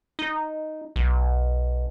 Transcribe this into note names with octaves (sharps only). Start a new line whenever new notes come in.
D#4
B1